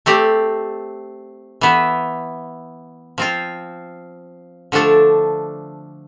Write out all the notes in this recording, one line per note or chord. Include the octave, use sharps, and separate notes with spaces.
A3 C4 G4 D5
E3 B3 E4
F3 C4 F4
D3 F3 A3 D4 A4